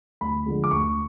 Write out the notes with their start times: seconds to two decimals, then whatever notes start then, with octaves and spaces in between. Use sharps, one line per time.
0.21 D2 B5
0.46 D3 F3 G#3
0.64 D6
0.71 D2 C#6